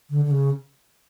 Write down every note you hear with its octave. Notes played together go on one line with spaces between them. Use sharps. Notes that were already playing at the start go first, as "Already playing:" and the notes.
D3
D3
C#3